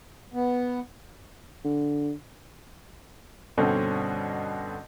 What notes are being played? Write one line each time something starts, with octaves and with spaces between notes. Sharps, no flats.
B3
D3
G2 B2 D3 C4 C#4